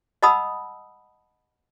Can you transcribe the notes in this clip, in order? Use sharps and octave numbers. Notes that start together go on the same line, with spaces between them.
D#5 F#5 A5 B5 D#6 E6